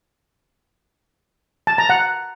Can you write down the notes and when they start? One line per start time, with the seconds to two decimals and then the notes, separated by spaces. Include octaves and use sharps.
1.67 A5
1.78 A#5
1.90 F#5